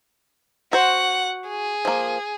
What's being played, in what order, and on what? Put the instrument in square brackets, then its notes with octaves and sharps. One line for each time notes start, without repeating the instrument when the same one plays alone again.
[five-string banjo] F#4 C5 [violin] F#5
[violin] G#4
[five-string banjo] F3 A#3